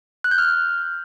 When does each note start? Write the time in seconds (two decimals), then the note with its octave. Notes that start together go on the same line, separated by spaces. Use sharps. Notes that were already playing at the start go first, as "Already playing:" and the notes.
0.24 F#6
0.31 G6
0.38 F6